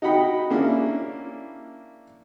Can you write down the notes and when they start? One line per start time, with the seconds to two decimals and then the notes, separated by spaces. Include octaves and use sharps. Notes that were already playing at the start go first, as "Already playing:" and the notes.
0.02 D#4 F#4 F#5 G5 B5
0.50 A#3 C#4 D4 E4